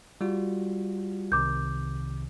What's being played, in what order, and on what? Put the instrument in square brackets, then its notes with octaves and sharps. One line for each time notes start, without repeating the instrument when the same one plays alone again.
[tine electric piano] G3 F4 F#4
[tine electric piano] C2 C3 D#3 [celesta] D6 G6